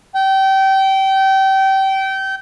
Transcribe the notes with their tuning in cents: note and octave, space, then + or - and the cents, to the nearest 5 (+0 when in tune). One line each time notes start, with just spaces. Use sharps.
G5 -25